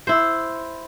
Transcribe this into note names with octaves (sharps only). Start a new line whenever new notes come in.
E4 C5